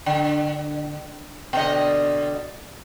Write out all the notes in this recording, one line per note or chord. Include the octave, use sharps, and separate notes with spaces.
D3
B2 D3 D#5